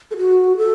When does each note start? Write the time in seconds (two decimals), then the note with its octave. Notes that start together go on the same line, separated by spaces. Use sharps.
0.11 A4
0.17 F#4
0.57 A4